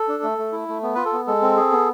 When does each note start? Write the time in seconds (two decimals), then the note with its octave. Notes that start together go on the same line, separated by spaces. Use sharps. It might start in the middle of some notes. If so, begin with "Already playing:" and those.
Already playing: A4
0.08 D4
0.23 A3
0.38 A3
0.52 E4
0.68 A3
0.83 B3
0.95 F4 B4
1.05 A4
1.13 B3
1.27 G#3 A4
1.42 C4
1.57 G#4
1.72 B3